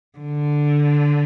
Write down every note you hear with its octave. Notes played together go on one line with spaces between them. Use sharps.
D3